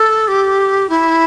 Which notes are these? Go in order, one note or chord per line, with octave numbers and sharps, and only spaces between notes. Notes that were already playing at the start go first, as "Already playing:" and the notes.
Already playing: A4
G4
E4